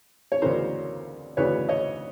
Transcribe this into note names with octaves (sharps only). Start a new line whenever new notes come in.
C#5
D2 C#3 E3 A#4 C5
D2 C#3 E3 B4 C#5
C#5 D#5